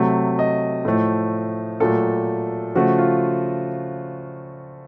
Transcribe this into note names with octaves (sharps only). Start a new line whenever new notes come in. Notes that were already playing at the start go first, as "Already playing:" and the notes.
Already playing: C3 F#3 A3
D#5
A2 F3 A3
A#2 F#3 A3 A4
C#3 F3 A3 F#4
F4